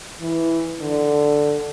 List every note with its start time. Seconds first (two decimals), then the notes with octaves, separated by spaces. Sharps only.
0.21 E3
0.81 D3